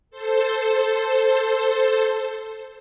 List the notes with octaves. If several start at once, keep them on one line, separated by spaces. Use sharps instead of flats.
A4 C5